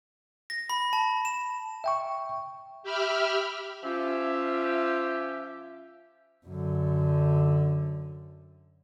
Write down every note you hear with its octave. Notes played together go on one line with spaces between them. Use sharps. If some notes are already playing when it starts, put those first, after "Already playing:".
A#6
B5
A5
E7
E5 G5 C#6
G4 E5 B5 F6
F3 C#4 F4 G4 E5
F#2 D3